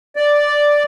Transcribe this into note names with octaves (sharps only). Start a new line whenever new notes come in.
D5